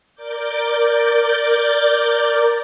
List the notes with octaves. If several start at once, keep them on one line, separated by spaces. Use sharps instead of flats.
A#4 D5 D6 G6